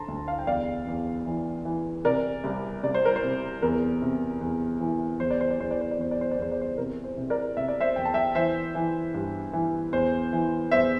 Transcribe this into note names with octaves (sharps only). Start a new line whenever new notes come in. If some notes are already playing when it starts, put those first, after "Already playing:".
Already playing: D3 A5 A#5 C6
D2
F5 A5
G5
E2 D5 F5
E2
E3
E3
C3 A#4 D5
C2
C2 D5
C5
A#4
C5
C3
E2 A#4
C3
E2
E3
E2 C5
D5
C5
D5
E2 C5
D5
C5
D5
E2 C5
D5
C5
D5
E2 C5
D5
C5
C3 A#4
C5
C3
A#4 D5
C3 E5
D5
C5 E5
E2 G5
A5
E5 G5
E3 C5 E5
E3
G2
E3
E2 C5
E3
E2 C5 E5